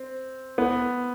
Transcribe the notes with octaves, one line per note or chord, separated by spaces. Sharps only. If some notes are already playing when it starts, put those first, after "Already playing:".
Already playing: C4
B3